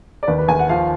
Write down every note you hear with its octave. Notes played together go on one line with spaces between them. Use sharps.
D5
D#2 B4
B4
D#2 G#5
F#5
F3 F5